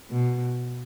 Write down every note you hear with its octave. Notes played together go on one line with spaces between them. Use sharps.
B2